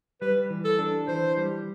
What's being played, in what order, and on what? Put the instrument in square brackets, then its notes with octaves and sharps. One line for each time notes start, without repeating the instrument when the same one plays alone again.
[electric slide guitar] G3 [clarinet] B4
[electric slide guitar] E3
[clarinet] A4
[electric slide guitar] D4
[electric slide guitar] E3 [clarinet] C5
[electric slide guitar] G3